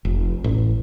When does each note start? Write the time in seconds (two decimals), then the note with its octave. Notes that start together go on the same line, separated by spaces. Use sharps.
0.05 F1
0.44 A1